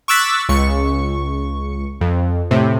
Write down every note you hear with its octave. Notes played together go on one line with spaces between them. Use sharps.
C#6 D6 E6 F#6 A6 B6
C#2 C#6
F2
A2 C3